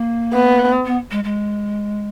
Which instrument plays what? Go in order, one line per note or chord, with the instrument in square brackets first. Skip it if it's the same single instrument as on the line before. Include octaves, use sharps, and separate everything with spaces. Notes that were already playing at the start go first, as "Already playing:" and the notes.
Already playing: [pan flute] A#3
[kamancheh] B3
[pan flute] B3
G#3
G#3